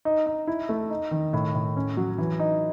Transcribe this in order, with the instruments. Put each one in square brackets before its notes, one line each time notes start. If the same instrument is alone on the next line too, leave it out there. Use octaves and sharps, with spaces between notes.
[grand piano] D#4
D#4
E4
A3
D#4
D#3
A2
A2
C#4
F#3
E3
D#4